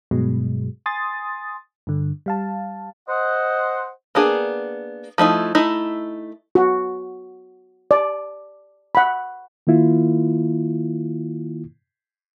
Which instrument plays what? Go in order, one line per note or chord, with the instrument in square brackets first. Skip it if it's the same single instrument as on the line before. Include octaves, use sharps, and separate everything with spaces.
[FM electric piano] G2 B2 F#3 G#3
G#5 C6 D#6 A6
G2 D3
G3 F5 A5
[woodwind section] C5 D#5 F#5
[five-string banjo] A#3 B3 D4 G#4
F3 A3 D#4 E4
A3 D#4 E4 D#5
[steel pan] F#4
D5
F#5 B5
[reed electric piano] D#3 A#3 E4 F4